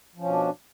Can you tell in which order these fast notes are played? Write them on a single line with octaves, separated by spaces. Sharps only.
F3 C#4 B2 D4